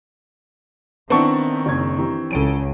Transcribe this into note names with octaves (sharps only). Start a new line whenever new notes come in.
D#3 B3 C4 D4 E4 A5 C#6
F#1 C#3 G#6
E3 G4 A#5
C#2 C#3 A4 D7 D#7